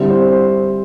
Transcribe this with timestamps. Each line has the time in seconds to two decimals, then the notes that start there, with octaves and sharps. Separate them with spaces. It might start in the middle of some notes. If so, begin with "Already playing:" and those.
Already playing: D3 G3 C4 E4
0.10 C5
0.32 C5